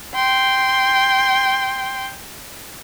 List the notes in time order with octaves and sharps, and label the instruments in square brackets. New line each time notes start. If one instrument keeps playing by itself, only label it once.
[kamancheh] G5 C6